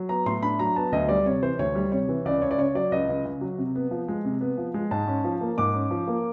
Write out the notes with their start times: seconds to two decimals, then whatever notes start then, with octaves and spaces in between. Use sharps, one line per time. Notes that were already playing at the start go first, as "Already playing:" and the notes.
Already playing: F#3
0.09 B3 A#5
0.26 A2 C6
0.43 D4 B5
0.59 F#3 A#5
0.76 B3 A5
0.92 D2 D#5
1.09 G3 D5
1.26 C3 C#5
1.43 E3 C5
1.59 D2 C#5
1.75 G3
1.92 C3 C#5
2.09 E3
2.25 C#2 D5
2.42 C#2 C#5
2.51 D5
2.58 C#3 C#5
2.75 F#3 D5
2.92 C#2 D#5
3.09 C#2
3.25 C#3
3.41 F#3
3.58 C3
3.75 B3
3.91 F3
4.08 G#3
4.25 C3
4.41 B3
4.58 F3
4.74 G#3
4.91 G#2 A5
5.08 C#4
5.24 F3
5.41 A#3
5.58 G#2 D6
5.74 C#4
5.91 F3
6.08 A#3